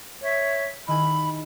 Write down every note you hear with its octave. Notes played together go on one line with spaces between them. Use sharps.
C#5 E5
D#3 E4 G#4 B5